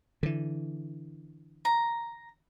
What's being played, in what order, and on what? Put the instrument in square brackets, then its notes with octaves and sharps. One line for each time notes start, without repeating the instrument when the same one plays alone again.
[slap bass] D3 E3
[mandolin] A#5